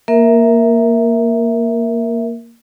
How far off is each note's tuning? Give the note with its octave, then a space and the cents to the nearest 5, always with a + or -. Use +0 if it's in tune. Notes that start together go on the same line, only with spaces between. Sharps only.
A#3 +0 A#4 +5 E5 +0